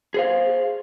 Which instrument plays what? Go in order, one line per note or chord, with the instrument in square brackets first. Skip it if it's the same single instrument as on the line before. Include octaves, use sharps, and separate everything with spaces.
[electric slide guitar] G#4 C5 F5